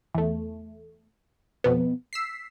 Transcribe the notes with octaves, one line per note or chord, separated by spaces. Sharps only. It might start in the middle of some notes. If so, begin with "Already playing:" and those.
E2 A3
F2 B2 B3
E6 B6 C7